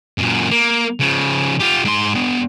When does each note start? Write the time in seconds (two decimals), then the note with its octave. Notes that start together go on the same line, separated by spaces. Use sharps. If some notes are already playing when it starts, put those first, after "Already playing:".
0.18 F#2 A#2
0.51 A#3
1.00 C#3 F3
1.60 F4 G4
1.85 G#2 C6
2.15 B3 D4